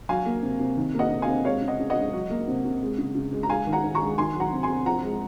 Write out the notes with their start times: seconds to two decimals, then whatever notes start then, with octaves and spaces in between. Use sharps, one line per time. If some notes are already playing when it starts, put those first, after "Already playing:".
0.09 F#3 F5 G#5
0.26 A#3
0.43 C3
0.60 C3
0.77 D#3
0.95 A#3 D#5 F#5
1.11 C3
1.22 F5 G#5
1.28 C3
1.45 G#3 C#5 F5
1.62 C#3
1.68 D#5 F#5
1.79 C#3
1.90 D#5 F#5
1.96 G#3
2.13 F#3
2.30 A#3
2.48 C3
2.65 C3
2.82 G#3
2.98 C#3
3.15 C#3
3.33 G#3
3.43 A#5
3.49 G#3 F5 G#5
3.67 D#3
3.73 F#5 A#5
3.84 D#3
3.95 A#5 C#6
4.01 G#3
4.18 D#3 G#5 C6
4.35 F#3 F#5 A#5
4.53 C3
4.63 G#5 C6
4.69 C3
4.86 F3 F#5 A#5
5.03 G#3